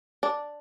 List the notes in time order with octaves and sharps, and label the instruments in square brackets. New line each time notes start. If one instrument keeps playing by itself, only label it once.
[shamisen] D4